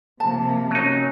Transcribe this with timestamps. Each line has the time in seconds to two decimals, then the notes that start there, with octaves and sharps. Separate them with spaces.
0.20 C3 F3 A#3 A5
0.71 F#3 C#4 D#4